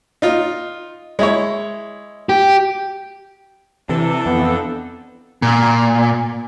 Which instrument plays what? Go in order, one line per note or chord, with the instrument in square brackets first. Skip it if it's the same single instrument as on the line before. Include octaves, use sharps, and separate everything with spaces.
[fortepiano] D#4 F4
G#3 E4 C#5
[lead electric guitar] G4
[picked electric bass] C3 [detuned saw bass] E3 [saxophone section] D4 A4
[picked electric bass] F2 [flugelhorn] B3
[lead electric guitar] A#2